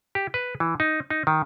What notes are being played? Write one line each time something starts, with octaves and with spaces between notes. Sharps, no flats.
G4
B4
E3
D#4
D#4
D#3